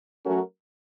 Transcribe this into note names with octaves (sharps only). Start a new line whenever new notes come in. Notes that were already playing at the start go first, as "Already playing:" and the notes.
F#3 A3 C#4 F#4 A#4